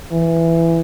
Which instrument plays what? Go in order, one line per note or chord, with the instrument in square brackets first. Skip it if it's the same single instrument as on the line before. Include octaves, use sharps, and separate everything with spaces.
[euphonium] E3